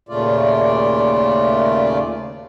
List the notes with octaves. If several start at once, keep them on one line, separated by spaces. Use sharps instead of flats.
D#2 A#2 C#3 A3 F4 D5